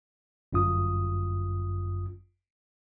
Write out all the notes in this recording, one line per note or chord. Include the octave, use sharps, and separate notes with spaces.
G1 F#2 F4 D#6